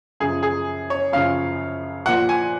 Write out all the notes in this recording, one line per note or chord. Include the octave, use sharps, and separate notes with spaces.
F#2 C#3 F3 G#4
G#4
C#5
F#2 C#3 F3 F5
A#2 F3 F#5
G#5